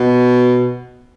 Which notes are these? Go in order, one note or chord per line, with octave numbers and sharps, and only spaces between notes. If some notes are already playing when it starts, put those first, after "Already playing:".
Already playing: B2